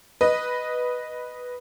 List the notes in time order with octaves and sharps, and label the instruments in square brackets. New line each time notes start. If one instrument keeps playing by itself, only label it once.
[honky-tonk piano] B4 D#5